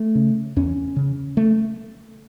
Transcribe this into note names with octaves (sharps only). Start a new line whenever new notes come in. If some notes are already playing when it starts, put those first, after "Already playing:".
Already playing: A3
C#3
E2 C#4
C#3
A3